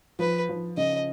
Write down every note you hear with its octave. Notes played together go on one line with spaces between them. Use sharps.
F3 B4
F3
C#3 D#5